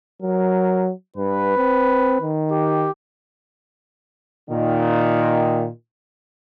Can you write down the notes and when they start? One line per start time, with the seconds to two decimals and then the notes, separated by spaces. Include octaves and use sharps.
0.22 F#3 A#4
1.17 G2 B4
1.57 C4
2.21 D#3
2.51 G4
4.50 A#2 D#3